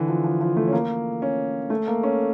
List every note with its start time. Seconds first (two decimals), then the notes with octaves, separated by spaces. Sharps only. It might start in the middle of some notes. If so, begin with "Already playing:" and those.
Already playing: D3 E3
0.08 F3
0.24 F3
0.41 F3
0.57 A3
0.68 C#4
0.73 A#3
1.22 C#4
1.70 A3
1.87 A#3
2.03 C#4